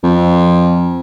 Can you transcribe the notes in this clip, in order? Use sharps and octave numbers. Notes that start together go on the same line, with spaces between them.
F2